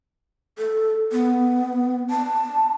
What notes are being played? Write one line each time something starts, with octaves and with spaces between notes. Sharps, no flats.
A4
B3
A5